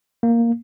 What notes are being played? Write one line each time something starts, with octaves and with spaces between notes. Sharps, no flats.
A#3